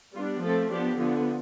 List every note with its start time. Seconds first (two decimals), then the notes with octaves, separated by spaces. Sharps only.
0.14 G3 B3 D4 F4
0.42 F3 A3 C4 A4
0.71 F3 B3 D4 G4
0.98 D3 F3 B3